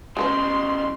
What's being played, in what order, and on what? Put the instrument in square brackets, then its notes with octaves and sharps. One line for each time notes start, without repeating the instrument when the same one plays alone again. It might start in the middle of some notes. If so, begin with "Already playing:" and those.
[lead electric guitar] C#3 G3 [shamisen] G#3 A4 B4 [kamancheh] C6